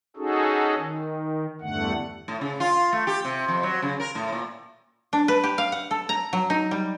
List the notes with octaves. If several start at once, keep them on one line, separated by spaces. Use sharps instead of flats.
C#4 D#4 F#4 G#4 A4
D#3
E2 G2 D3 A3 F#5
A2
C#3
F4
A3
G4
C3
F2
F#3
C#3
A#4
A2
A#2
D4
B4
G4
F5
F#5
A4
A#5
F#3
D#4
G3